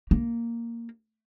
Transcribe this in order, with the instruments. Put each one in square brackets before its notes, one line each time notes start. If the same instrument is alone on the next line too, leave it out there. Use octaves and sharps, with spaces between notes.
[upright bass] A#3